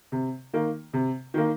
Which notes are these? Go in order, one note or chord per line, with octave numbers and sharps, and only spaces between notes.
C3
D#3 A#3
C3
D#3 A#3